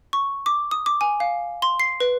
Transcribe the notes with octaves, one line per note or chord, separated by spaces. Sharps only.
C#6
D6
D#6
D6
G#5
F5
C6
C7
B4